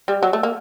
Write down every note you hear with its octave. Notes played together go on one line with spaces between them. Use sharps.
G3
F#3
A3
A#3